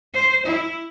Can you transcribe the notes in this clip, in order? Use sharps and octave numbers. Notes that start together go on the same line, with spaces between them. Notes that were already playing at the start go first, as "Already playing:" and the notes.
C5
E4